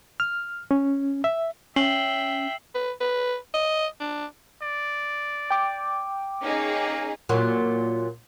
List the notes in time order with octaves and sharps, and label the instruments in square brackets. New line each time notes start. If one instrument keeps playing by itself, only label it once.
[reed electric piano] F6
C#4
E5
[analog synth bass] C#4 [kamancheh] E5 G5 [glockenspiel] C7 F#7 G7
[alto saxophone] B4
B4
D#5
D4
[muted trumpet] D5
[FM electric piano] G5 D6
[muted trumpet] A#3 [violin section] C#4 D#4 G#4
[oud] A#2 F#3